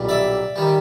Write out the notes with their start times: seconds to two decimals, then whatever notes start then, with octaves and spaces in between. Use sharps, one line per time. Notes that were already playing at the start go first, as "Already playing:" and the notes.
Already playing: B1 A#2 G3
0.09 D5 E5
0.56 D#3 G3